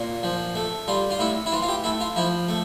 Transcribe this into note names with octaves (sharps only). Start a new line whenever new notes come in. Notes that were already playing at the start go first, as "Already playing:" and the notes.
Already playing: A#2
F3
A3
G3 F4
F4
A2 E4
E4
E3 F4
F4
G4
A3 E4
F4
F3 E4
A3